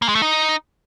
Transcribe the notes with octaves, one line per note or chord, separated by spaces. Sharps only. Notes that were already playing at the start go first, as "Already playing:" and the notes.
A#3
G#3
A3
D#4